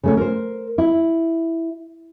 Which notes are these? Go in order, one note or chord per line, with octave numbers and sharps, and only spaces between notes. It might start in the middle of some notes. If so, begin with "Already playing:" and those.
C#3 A3 C#4
A#4 C5
E4